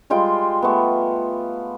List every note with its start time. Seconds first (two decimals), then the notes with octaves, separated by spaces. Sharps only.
0.10 G3 G#3 F4 G5
0.62 A3 B3